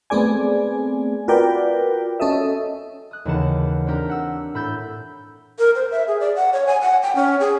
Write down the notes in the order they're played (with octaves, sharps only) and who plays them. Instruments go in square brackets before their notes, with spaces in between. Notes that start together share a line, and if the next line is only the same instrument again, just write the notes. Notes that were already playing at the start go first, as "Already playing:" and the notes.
[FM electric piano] A3 B3 C4 G#4 D5 G#5
F4 F#4 A#4 B4 D5 G5
C#4 A4 D#5 E5
[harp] D#6 F#6
D#2 C#3 E3 F#5 A5
C4 D4 G4 A#4
F#5 E6
A2 B5 E6 G6 A6
[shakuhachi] A#4
C5
E5
G#4
D5
F#5
C#5
G#5
F#5
G5
C#4
G#4